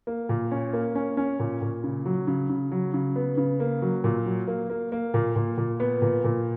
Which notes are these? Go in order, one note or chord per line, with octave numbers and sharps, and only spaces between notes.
A#3
A#2
C#4
A#3
C#4
C#4
A#2
A#2
C#3
F#3
C#3
C#3
F#3
C#3
B3
C#3
A#3
F#3
A#2
F#3
A#3
A#3
A#3
A#2
A#2
A#2
B3
A#2
A#2